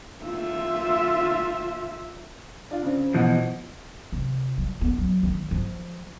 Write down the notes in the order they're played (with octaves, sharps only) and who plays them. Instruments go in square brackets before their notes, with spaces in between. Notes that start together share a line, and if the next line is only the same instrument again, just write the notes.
[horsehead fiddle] F4 E5
[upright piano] D4 F4
C#3 C4
[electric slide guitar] B2 E3 F3 [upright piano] C4 D#5 F#5
[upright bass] C3
G3
B3
F#3
D#3
F3